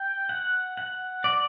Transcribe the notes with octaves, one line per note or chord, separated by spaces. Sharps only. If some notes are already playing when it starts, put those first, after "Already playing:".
Already playing: G5
F#5
F#5
D5